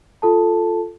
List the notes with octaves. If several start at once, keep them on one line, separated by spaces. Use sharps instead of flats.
F4 A4 A5